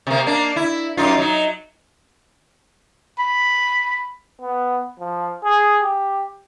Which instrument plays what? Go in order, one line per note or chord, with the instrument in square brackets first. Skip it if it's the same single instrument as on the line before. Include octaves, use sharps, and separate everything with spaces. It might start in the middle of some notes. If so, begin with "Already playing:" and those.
[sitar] C3 A#3
A#3 D4
E4
F#2 D#4 F4
F#3 D#4
[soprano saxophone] B5
[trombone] B3
F3
G#4
G4